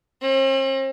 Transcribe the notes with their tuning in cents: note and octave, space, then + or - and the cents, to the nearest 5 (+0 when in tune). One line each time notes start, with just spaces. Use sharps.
C4 +45